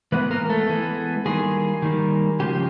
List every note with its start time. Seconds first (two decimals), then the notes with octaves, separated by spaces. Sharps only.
0.12 E3 G#3 B3 B4
0.31 A#3 A#4
0.50 A3 A4
0.69 E3 G#3 B3
1.25 D#3 G3 G#3 A#3 G#4
1.82 D#3 G3 A#3
2.39 C#3 F3 G#3 G4